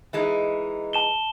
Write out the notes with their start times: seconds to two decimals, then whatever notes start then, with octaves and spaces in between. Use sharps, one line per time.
0.13 E3 G#3 D#4
0.93 A5 E7 G7